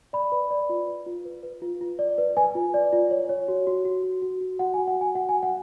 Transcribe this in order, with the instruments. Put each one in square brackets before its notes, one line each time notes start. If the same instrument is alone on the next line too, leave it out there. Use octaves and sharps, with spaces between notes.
[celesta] D5 B5
B4
D5
F4
B4
F4
B4
B4
F4
F4
D5
B4
B4 G#5
F4
D5
F4
C#5
C#5
F#4
F#4
F#4
F#4
F#4
F#4
F#4 F#5
F#4 G#5
F#5
F#4 G#5
F#4 F#5
G#5
F#4
F#5